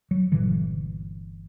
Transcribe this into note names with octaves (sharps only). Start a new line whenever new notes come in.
F#3
G1 A#2 D3 E3